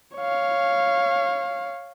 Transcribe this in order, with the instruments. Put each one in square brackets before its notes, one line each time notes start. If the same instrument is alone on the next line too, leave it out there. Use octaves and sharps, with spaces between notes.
[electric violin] C#5 F5